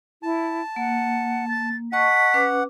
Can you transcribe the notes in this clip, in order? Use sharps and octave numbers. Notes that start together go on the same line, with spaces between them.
E4 A5
A#3 F#5
A6
D#5 F#5 A5 C#6 B6
C#4 B4 D6